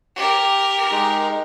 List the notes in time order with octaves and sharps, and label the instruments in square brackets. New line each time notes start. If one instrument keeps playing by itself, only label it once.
[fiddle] G4 A#4
[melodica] G#3 D#4